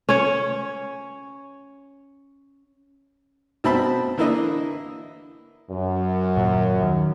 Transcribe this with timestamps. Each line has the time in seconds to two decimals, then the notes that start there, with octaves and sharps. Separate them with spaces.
0.09 C#4 C#5
3.64 B2 C4 E5 A5 B5
4.18 D3 E3 A#3 E4 B4 D#5
5.71 F#2
6.37 D#2 A#2
6.82 D#3